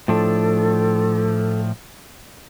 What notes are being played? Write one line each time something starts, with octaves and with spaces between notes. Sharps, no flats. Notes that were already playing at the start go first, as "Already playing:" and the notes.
A2 F3 D4 A4